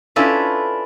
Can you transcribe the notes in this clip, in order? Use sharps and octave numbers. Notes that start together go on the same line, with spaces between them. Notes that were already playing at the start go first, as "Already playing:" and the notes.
C#4 D4 E4 F4 A4 B4